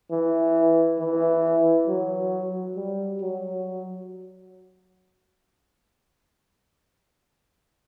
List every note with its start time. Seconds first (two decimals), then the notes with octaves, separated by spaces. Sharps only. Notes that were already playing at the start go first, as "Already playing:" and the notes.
0.11 E3
0.99 E3
1.88 F#3
2.76 G3
3.21 F#3